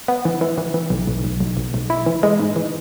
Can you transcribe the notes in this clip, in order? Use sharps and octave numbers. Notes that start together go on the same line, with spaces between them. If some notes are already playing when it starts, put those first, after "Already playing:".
B3
E3
E3
E3
E3
B1
B1
B1
B1
B1
B1
E4
E3
G#3
G#2
E3